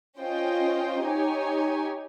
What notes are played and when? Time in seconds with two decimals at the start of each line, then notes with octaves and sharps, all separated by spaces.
0.19 C#4 F4 C5 D#5 G5
1.02 D#4 G4 C#5 G#5